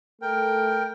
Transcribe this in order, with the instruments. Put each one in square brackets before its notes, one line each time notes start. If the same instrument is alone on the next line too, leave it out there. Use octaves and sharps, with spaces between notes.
[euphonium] A3 [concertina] A#4 G5